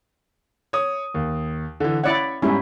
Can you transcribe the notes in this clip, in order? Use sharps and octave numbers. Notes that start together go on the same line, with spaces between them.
C#5 D#6
D#2
D3 E3
C#4 E4 C#5 D5 F#5
G#2 G3 C#4 E4